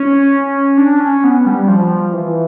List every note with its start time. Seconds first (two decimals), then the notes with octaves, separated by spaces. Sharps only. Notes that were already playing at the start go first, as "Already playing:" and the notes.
Already playing: C#4
0.77 D4
1.00 C#4
1.24 B3
1.46 G3
1.68 F3
2.13 E3